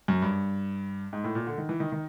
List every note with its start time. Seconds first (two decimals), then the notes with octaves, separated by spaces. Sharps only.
0.08 F#2
0.22 G2
1.13 G#2
1.24 A2
1.35 A#2
1.47 D3
1.58 D#3
1.69 E3
1.80 D#3
1.92 D#3